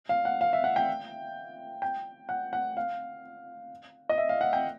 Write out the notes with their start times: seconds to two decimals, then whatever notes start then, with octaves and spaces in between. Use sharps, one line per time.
0.09 F5
0.25 F#5
0.41 F5
0.53 E5
0.64 F#5
0.76 G5
1.82 G5
2.29 F#5
2.53 F#5
2.77 F5
4.09 D#5
4.18 E5
4.29 F5
4.41 F#5
4.53 G5